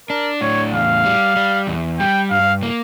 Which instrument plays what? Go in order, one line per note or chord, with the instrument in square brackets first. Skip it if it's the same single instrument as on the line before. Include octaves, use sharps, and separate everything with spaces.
[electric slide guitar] D4 [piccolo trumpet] A#4
[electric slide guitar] A2 [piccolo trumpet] C#5
[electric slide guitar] E2 [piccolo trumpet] F5
[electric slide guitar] G3
G3
E2
[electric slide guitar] G3 [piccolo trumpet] G5
[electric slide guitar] G2 [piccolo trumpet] F5
[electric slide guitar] A#3